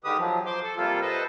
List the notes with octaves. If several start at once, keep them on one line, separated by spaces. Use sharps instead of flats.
D3 D#3 G#3 G4 B4 D#6
F3 F#3
C5 C6 D6
A4
C3 G3 A#3 F4 A4
A4 B4 C5 D#5